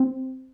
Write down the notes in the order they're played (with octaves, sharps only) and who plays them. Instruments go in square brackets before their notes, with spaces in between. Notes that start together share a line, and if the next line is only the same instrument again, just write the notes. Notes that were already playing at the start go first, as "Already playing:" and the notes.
Already playing: [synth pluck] C4